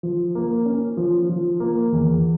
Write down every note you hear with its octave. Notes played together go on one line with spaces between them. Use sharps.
F3
A#3
C#4
F3
F3
A#3
E2